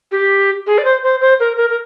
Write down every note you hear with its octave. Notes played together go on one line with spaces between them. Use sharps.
G4
G#4
D5
C5
C5
C5
A#4
A#4
A#4